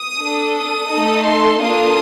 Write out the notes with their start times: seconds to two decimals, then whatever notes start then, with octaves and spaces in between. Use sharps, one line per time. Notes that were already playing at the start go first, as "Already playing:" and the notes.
Already playing: D#6
0.21 D4 A4
0.56 D#6
0.91 A3 D#4 A4
1.25 C6
1.59 A#3 D4 F4 A4 D#6